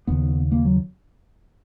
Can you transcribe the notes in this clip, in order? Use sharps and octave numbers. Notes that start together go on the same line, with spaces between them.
D#2 C#3 B3
A#3
F#3